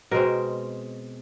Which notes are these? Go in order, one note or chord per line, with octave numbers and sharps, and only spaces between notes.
B2 G#3 C4 A#4